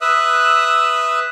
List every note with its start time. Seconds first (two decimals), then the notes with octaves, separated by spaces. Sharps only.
0.01 B4 E5 D#6 E6 F#6